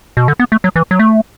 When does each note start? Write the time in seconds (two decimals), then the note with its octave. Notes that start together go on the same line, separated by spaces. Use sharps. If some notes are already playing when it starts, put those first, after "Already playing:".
0.17 B2
0.28 D3
0.39 B3
0.52 A3
0.64 F#3
0.76 E3
0.91 F#3
0.99 A3